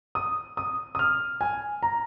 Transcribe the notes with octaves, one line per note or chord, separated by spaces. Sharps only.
D#6
D#6
D#6
F6
G#5
A#5